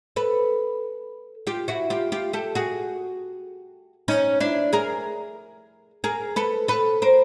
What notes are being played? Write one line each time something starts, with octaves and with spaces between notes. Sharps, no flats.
A4 B4
F4 G4
E4 F#4
F4 G4
F4 G4
G4 A4
F#4 G#4
C#4 D#4
D4 E4
G#4 A#4
G#4 A#4
A4 B4
A4 B4
A#4 C5